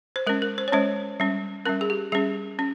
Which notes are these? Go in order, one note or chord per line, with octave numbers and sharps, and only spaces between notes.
C5
G#3 C#4 A#4
A#4
C5
C#5
G#3 C#4 C5
G3 C#4
G3 C#4 A#4
G#4
G4
G3 C#4 G#4
C#4